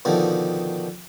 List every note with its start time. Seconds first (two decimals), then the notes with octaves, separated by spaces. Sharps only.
0.05 B2 D3 D#3 F3